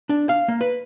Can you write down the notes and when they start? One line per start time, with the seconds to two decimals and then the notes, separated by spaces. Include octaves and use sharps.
0.09 D4
0.29 F5
0.48 A#3
0.61 B4